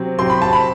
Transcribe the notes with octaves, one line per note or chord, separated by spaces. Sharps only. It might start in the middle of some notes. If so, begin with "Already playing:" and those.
Already playing: C3 F#3 C4
C3 F#3 C4 C6
B5
A5
B5